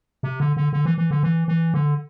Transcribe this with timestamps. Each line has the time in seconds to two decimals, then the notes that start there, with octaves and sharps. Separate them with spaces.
0.23 C3
0.40 D3
0.57 D3
0.73 D3
0.85 E3
0.98 E3
1.11 D3
1.23 E3
1.48 E3
1.74 D3